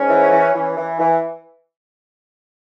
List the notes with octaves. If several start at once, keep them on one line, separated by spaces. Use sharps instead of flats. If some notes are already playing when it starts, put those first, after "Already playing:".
Already playing: G#2 C#4
E3
E3
E3
E3
E3